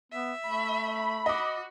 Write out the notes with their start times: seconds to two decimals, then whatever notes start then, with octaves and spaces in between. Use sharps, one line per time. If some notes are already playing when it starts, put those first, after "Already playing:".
0.12 B3 E5
0.46 A3 B5
1.26 F#4 D#5 D6